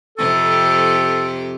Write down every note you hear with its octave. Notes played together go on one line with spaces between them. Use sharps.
F2 C3 G4 A4